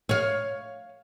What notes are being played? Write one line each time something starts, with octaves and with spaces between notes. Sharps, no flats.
C#5 F5